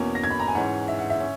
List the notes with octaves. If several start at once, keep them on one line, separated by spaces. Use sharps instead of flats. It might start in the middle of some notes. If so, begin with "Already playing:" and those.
Already playing: E2 B2 A#3 C#4
A#6
G#6
B5
A#5
G#5
G#2 E3 G#3 C#4 F#5
E5
F#5
E5
C#4